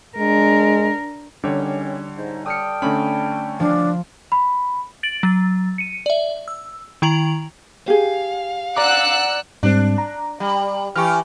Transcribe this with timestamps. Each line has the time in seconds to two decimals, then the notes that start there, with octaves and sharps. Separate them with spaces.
0.18 G#3 D4 A#4
1.44 D3 D#3 F#3 G3 C#4 C#5
2.17 G#2 D#4
2.46 A4 D5 G5 D#6 F6 C#7
2.82 D3 A3 C#4 B5
3.60 F3 D4
4.32 B5
5.03 A6 D7 F#7
5.23 F#3 A6
5.78 C#7 D#7
6.06 D5 E5
6.48 E6
7.02 D#3 E4 A#5 F7 F#7
7.88 G4 G#4 F5
8.77 D5 F#5 A#5 D6 E6 F#6
9.63 G#2 G3 C4 D4
9.98 A#5
10.40 G3
10.96 E3 G4 C#6 F6